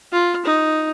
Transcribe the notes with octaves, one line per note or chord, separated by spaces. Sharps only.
F4
D#4